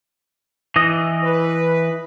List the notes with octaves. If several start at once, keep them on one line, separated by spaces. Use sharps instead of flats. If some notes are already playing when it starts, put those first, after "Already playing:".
E3 D#5
B4